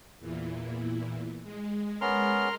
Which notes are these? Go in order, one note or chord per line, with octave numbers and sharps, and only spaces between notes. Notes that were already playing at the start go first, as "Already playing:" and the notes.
E2 A#2 E3
G#3
B3 C#4 A#4 C6 F6